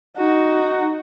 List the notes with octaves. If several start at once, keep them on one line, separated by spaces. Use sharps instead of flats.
D#4 F#4